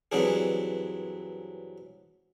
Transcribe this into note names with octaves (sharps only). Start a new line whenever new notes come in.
G2 E3 F#3 C4 D4 G#4